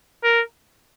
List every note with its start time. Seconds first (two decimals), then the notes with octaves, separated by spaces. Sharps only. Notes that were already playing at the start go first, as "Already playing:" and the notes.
0.24 A#4